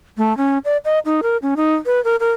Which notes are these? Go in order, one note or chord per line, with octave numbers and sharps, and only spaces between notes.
A3
C#4
D5
D#5
D#4
A#4
C#4
D#4
B4
A#4
A#4